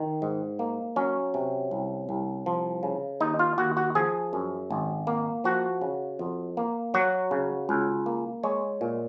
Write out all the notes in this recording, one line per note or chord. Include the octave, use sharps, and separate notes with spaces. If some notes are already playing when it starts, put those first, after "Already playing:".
Already playing: D#3
G#2
A#3
F#3 C#4
C3
C2
C2
F3
C#3
D#2 D#4
F4
D#2 F#4
F#4
F3 G#4
F#2
G#1
A#3
F3 F#4
C#3
F2
A#3
F#3 F#4
C#3
C#2
A#3
G#3 C#5
A#2